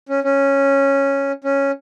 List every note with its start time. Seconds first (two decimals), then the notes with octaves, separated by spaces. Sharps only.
0.09 C#4
0.24 C#4
1.44 C#4